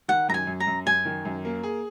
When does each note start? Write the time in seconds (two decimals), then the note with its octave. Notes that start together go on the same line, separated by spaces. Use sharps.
0.08 D#3 F#5
0.28 F#2 A#5
0.34 G#5
0.47 F#2
0.60 A#5
0.67 F#2
0.86 F#2 G#5
1.05 D#3
1.25 F#2
1.45 A#3
1.63 G#4